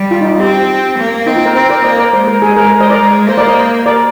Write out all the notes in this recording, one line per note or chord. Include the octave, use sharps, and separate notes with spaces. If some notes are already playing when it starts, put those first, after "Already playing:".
Already playing: G3
F4
D#4
F4
C4 G4
A#3
C4 D#4
F4
A#4
C4 C5
A#4 D5
A#3 C5 D#5
A#4 D5
G#3 C5
A#4
G#4
A#4
A#4
C5 D#5
A#4 D5
G#3
A#3 C5
A#4 D5
C5 D#5
A#4 D5